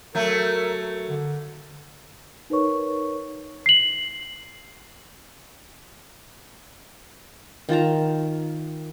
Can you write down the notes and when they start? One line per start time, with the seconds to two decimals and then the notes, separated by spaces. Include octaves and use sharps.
0.15 F#3 A3 A#4
1.10 D3
2.50 D#4 A#4 B4 C#5 C#6
3.66 C7 F#7
7.69 D#3 F4 A5 A#5